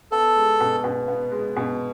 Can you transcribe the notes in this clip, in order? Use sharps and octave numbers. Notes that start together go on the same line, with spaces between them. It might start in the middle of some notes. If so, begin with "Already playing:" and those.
B3 A4
G#3
B2
B2
B3
G#3
B2